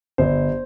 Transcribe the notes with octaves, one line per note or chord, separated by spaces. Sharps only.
G1 C5